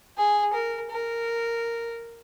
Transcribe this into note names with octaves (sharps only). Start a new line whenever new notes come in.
G#4
A#4
A#4